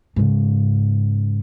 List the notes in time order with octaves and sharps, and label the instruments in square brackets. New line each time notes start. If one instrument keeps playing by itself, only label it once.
[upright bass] G#2 C#3